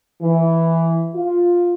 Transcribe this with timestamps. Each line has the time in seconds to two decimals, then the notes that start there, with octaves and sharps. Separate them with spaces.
0.22 E3
1.15 F4